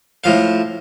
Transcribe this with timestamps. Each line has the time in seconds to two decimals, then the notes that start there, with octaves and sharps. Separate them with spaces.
0.24 A2 F3 F5